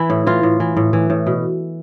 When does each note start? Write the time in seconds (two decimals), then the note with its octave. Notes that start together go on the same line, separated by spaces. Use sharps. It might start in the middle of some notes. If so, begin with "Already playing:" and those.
Already playing: E3 E4
0.10 A2
0.26 E3 F4
0.43 A2
0.60 E3
0.76 A2
0.93 E3
1.10 A2
1.26 B2